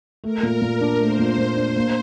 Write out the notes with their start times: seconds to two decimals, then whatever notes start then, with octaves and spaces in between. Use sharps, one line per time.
0.24 A3 A#4
0.43 A#2
0.62 A#2
0.81 D4
1.00 A3 C5
1.19 A#2
1.38 A#2
1.57 D4
1.76 A#3